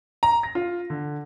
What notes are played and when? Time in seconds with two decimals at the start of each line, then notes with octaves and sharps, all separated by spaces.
0.23 A#5
0.43 A#6
0.55 F4
0.90 D3